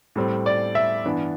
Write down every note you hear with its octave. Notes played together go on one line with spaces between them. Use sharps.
A2 G3 C4
D5
E5
G2 E3 B3 D4